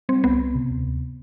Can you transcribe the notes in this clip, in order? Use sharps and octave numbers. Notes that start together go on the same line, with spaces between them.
G3 C4
C2 B3
C2
C3
D2
D2